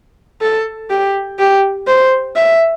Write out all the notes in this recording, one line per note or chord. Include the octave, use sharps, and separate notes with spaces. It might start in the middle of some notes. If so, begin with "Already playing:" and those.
A4
G4
G4
C5
E5